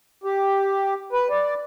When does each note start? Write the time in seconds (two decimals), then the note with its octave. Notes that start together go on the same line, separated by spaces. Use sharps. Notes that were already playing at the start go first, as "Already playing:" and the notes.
0.24 G4
1.13 B4
1.30 D5